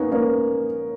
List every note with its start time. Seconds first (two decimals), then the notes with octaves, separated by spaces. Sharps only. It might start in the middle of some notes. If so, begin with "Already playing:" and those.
Already playing: A#3 B3 C#4 D#4
0.12 A#3 C#4